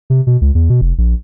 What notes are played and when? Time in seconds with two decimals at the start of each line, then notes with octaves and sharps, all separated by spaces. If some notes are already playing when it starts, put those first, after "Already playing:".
0.10 C3
0.27 B2
0.41 C#2
0.55 E2
0.69 B2
0.81 F1
0.98 A#1